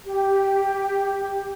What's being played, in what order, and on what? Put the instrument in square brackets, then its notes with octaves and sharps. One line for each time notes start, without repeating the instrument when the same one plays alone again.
[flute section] G4